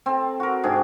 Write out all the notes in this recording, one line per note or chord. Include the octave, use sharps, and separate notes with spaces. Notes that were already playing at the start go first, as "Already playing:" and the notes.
C4 A4
F#4 A#4
G#2 C3 D4 G#4